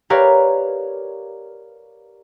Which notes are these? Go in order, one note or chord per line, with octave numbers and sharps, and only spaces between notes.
G4 A#4 B4 C#5 D5 F5